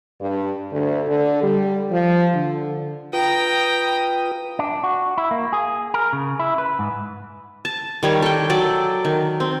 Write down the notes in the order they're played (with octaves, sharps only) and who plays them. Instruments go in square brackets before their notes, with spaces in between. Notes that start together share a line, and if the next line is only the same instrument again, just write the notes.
[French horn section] G2
D2
D3
G3
F3
D3
[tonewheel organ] F4 B4 D#6 [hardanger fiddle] G5 A#5
[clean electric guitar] D4
F#4
E4
A#3
G#4
A#4
C#3
E4
B4
G#2
[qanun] A5
D#3 G3 C#5
A4 G5
F#3 A4 D5
D#3
C4